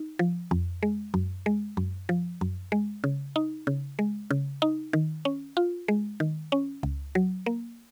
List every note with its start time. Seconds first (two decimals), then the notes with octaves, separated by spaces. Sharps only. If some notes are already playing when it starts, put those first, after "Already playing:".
Already playing: D#4
0.19 F3
0.51 F2
0.83 G#3
1.14 F#2
1.46 G#3
1.77 F#2
2.09 F3
2.41 F#2
2.72 G#3
3.04 C#3
3.36 D#4
3.67 C#3
3.99 G#3
4.31 C#3
4.62 D#4
4.93 D#3
5.25 C#4
5.57 F4
5.88 G#3
6.20 D#3
6.52 C#4
6.83 C#2
7.15 F#3
7.46 A#3